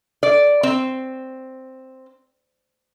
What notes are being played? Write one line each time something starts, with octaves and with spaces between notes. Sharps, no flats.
D5
C4